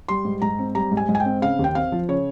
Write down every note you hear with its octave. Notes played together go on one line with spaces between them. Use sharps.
G3 C6
G#2
G#2 A#5
C4
G3 A#5
G#2
G#5
G#2
G#5
G5
C4
C#3 F5
D#2
G5
C4 F5
F3
C#3 C#5